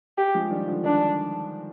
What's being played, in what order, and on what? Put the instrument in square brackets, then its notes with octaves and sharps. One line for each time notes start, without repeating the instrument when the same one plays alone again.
[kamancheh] G4
[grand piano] F3 G#3
D#3 G3
D3 F3
[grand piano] D#3 [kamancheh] D4